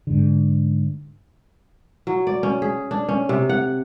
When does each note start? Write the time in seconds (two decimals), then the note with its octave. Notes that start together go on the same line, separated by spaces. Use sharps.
0.07 G#2 D3
2.07 F#3
2.27 D5
2.43 C#4
2.62 G#4
2.91 D4
3.09 C#4
3.29 C3
3.49 F#5